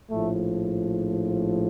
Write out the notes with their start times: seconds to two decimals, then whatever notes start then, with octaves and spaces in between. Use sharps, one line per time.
0.10 A#1 A2 F3 A3